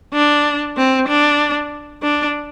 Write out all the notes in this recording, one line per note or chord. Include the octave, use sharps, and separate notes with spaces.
D4
C4
D4
D4